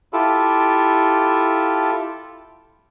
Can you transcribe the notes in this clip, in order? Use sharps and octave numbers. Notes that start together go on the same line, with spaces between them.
E4 F4 G4 A4